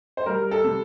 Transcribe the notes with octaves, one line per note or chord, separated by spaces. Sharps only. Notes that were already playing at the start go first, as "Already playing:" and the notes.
C5
G3 A#4
A4
C3